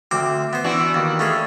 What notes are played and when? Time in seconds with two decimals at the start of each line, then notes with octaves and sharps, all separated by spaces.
0.11 D2 C4 D6
0.53 B3 C5
0.64 E3 D4 F#4
0.94 D#2
1.19 A3 C#4 G#4